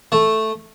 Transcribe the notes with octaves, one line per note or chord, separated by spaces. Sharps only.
A3